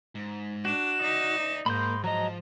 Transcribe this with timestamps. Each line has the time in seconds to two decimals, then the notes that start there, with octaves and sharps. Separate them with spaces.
0.15 G#2
0.65 D4 F#4 E7
1.02 D#4 D5 E5
1.66 G#2 A#3 B5 C6 G6
2.04 F3 F#3 D#5 A#5